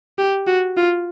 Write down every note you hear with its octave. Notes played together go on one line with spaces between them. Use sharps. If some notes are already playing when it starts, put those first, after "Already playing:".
G4
F#4
F4